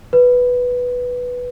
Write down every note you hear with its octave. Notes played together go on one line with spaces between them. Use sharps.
B4